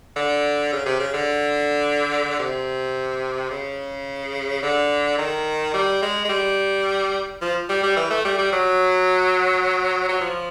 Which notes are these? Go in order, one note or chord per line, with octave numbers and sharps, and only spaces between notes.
D3
C#3
C3
C#3
D3
C3
C#3
D3
D#3
G3
G#3
G#3
G3
F3
G3
G3
E3
A3
G3
G3
F#3
F#3
F3